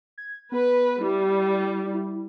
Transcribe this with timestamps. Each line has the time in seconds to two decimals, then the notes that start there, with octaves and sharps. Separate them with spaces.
0.18 G#6
0.52 B3 B4
1.01 G3 E4
1.94 E4